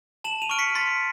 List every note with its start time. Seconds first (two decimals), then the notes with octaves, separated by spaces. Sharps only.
0.24 A5 E7 F#7
0.42 D#7 F7
0.50 C#6 F6 D7
0.59 B6 C#7
0.75 C6 A6 B6